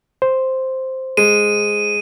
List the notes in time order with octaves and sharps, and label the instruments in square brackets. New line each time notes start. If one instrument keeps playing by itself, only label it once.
[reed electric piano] C5
[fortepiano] G#3 [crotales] D#7